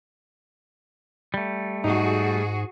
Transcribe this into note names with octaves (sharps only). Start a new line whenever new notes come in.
G3 A3
G#2 D#4 F#4 G#4